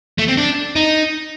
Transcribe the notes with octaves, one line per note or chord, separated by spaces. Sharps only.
A3
C4
D4
D#4